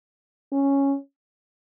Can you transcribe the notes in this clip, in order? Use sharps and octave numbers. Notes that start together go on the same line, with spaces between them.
C#4